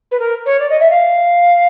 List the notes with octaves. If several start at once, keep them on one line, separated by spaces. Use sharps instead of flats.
B4
A#4
C#5
D5
D#5
E5
F5